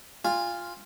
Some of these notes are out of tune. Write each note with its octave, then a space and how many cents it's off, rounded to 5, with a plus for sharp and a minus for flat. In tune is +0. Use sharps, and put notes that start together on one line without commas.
F4 +0 G#5 -30